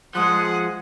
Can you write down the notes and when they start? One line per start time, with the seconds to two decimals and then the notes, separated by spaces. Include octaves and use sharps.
0.15 F3 G#3 G#4 F#5 D#6 F#6